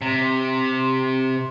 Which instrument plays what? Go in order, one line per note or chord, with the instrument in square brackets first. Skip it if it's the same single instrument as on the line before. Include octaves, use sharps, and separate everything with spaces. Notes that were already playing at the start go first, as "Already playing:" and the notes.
[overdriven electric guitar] C3